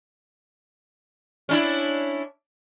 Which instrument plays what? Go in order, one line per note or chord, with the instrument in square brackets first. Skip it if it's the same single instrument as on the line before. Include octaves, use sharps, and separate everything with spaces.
[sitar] C#4 D4 E4